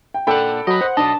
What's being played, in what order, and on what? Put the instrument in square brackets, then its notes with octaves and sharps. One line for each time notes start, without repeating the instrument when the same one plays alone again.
[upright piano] G5
[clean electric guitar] A#2 D4 F#5 [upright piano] A4 G5 B5
[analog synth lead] F#3 [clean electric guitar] B4 D#5
[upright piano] C5 [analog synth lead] F#5
[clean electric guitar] B1 B2 D#5 [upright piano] D4 [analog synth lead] A5